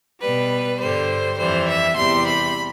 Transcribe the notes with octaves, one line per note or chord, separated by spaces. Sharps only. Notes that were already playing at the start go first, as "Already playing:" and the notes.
B2 G3 B4
G2 D3 G3 C5
F2 E3 G3 C5
E5
E2 C3 G3 C6
B5